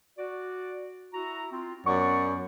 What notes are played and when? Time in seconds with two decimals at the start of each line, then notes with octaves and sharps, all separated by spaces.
0.18 F#4 D5
1.14 E4 F#4 A#5
1.51 C4 F4
1.86 F#2 B3 D5 F#5 C#6